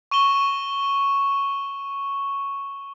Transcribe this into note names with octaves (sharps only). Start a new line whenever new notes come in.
C#6 D#7 E7 G7